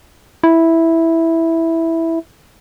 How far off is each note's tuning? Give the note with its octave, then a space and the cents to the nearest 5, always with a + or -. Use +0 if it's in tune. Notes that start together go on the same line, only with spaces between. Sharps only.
E4 -5